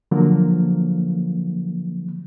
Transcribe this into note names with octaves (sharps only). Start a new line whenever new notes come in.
D3 F3 F#3 A#3